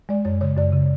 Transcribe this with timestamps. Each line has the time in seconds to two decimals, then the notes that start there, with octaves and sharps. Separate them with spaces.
0.09 G#3 D5
0.25 F#2 C#5
0.41 C#3 C#5
0.57 F#2 D5
0.73 C#3